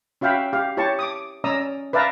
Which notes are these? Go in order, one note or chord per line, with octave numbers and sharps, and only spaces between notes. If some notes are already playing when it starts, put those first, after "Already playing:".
C#4 F#4 E5 F5 G5 B5
G4 F5
E4 G4 C#5 A5 C#6
D6 D#6
C#4 D5 D#5 A#5 D#6 E6
B4 D5 E5 F5 A5 A#5